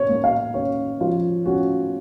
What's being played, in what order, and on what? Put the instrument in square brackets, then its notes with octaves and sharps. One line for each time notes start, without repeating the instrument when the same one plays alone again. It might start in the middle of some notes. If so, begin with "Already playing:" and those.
Already playing: [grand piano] C#4 C#5
A#3
F5
C#4 C#5
F3 F4
C#4 F#4